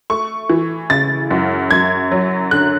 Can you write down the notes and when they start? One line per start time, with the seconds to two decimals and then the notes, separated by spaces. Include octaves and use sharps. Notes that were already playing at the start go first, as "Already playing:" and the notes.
0.10 A3 C#6
0.50 E3
0.90 C#3 A6
1.31 F#2
1.71 F#2 G#6
2.12 F#3
2.51 D3 F#6